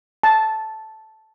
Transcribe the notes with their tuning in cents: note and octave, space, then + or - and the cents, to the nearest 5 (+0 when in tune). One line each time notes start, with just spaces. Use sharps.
A5 -5